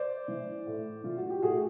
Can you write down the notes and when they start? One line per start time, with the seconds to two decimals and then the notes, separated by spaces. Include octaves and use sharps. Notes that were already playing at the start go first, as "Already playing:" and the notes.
Already playing: C5 D5
0.28 E3
0.67 A2
1.04 E3 F4
1.17 F#4
1.30 G4
1.42 A2 F#4 G#4